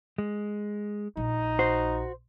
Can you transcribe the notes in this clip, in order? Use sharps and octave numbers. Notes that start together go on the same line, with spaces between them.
G#3
A#1 D#4
F#4 C5